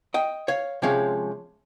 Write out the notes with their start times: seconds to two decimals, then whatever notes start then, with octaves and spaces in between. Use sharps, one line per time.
0.14 D#5 G5
0.48 C#5 F5
0.82 C3 F3 G#3 C#4 C#5 F5